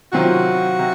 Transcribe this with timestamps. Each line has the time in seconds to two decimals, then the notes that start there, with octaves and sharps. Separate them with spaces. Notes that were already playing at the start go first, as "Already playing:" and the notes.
0.13 C3 D#3 F#3 C4 F4 F#4
0.79 C3